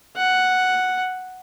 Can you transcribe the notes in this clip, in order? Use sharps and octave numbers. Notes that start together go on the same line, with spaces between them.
F#5